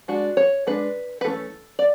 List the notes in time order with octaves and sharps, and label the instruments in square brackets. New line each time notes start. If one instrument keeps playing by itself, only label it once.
[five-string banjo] G#3 D4 F#4
C#5
G#3 D4 B4
B4
E3 A3 C#4 A4
D5